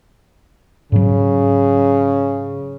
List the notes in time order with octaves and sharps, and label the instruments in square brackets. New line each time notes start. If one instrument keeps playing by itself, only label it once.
[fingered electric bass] G#2 F#3 [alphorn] C#3